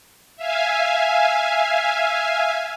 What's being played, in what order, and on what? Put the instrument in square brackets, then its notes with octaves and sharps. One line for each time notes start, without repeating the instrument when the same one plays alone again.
[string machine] E5 F5 G#5